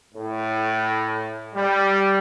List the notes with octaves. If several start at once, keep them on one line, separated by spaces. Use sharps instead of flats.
A2
G3